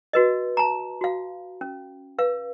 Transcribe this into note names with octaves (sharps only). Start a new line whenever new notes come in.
F#4 B4 D#5
A5 A#5
F#4 F5
C#4
B4 F5